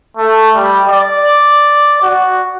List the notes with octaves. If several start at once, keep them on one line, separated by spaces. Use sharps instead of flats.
A3
G3
D5
F#4